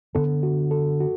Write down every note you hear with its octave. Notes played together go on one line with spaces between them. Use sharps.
D3 B3 D4 A4
F#4
A4
F#4